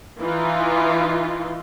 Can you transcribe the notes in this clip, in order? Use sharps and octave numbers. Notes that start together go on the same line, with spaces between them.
E3 D#4 F4